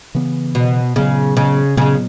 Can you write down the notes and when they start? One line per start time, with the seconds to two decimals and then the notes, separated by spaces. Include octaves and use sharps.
0.15 C#3 E3 B3
0.55 B2
0.96 A#2 C#3 F#3 B3
1.37 C#3
1.77 A#2 C#3 F#3 B3